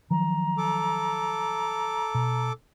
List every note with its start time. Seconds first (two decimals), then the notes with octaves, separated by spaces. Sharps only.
0.11 D#3 F3 F#3 A#5
0.58 A4 D6
2.15 B2